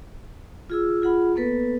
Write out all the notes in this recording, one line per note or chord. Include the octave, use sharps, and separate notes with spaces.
F4 G#4 E6
F4 G#4 F#5 B5
A#3 B3 A4 B4